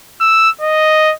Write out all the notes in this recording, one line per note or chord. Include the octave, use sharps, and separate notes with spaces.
E6
D#5